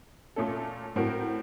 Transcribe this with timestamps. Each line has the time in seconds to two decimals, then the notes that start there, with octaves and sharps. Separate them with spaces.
0.36 A#2 A3 C#4 A4
0.96 A2 F#3 C4 F#4 A#4